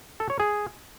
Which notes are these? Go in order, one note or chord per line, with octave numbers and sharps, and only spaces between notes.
A4
C#5
G#4